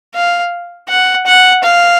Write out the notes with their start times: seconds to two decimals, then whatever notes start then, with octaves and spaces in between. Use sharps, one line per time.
0.15 F5
0.89 F#5
1.26 F#5
1.63 F5